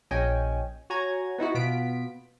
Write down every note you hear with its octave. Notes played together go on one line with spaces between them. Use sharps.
A#1 C#4 D#5 G5 G#5
F#4 C#5 G#5 A#5 G#6
B3 D#4 E4 F#4
B2 B3 F4 B6 D7